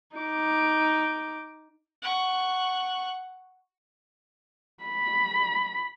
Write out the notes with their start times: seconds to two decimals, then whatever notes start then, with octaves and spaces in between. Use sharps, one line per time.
0.16 D#4 D6
2.02 F#5 C#6
4.84 B5